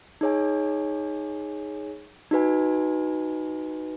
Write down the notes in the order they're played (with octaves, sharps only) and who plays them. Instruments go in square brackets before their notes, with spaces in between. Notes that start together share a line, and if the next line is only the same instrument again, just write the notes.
[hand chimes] D#4 G#4 C#5 G#5
D#4 F#4 B4 G#5